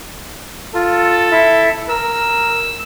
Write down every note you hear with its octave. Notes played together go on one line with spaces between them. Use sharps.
F4 A4
E4 E5
A#4 E6